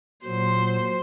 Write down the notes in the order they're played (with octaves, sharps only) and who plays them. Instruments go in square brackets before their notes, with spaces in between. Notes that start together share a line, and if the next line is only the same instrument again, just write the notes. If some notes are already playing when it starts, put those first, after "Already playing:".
[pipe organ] A#2 F#3 [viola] C5